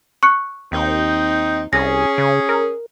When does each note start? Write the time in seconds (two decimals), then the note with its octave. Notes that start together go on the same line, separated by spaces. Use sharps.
0.23 C#6 F#6 C#7
0.72 D#2 C4 D#4
1.73 C2 C#4 G#4 A#6
2.18 C#3
2.49 A#4